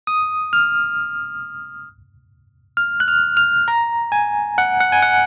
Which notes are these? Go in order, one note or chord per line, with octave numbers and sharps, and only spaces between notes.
D#6
F6
F6
F#6
F6
F6
A#5
G#5
F#5
F#5
G#5
F#5